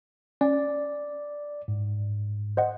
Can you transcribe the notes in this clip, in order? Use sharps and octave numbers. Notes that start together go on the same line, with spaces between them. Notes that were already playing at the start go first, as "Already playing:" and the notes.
C#4 D5
G#2
C5 D#5 F#5